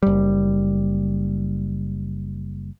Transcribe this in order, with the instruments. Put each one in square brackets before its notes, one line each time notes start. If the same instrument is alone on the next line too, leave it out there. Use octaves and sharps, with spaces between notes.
[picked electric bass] F#1 G3